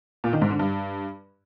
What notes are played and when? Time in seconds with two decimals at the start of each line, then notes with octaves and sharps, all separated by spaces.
0.24 A#2
0.33 D#3
0.42 G#2
0.50 D3
0.59 G2